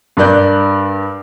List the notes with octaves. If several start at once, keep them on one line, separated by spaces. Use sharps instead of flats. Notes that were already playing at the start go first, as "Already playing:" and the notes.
G2 A#4 D5 F#6 G6